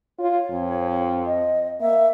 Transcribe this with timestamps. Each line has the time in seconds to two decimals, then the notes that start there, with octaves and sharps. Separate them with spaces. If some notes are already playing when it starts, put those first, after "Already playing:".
0.19 F4 C#5
0.50 F2
1.26 D#5
1.80 A#3 E5